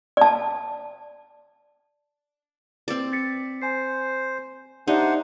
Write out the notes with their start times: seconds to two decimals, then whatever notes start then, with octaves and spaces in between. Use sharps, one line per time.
0.17 D5 A5
2.88 C4 D5
3.13 A6 B6 C#7
3.62 C5 G#5 C7
4.87 D4 D#4 G4 C5 D5 E5 F#5